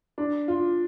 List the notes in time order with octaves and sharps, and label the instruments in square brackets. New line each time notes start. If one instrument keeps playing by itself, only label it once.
[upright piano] D4
F4